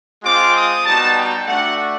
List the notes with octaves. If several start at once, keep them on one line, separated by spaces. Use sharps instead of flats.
G#3 C4 F4 D6
D#6
G3 B3 D#4 F#4 A5
G5
A3 D4 F#4 F#5